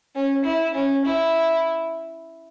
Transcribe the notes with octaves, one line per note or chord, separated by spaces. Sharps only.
C#4
E4
C#4
E4